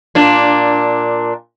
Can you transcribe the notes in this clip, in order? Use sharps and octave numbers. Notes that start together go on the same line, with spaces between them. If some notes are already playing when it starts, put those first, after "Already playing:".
A#2 D4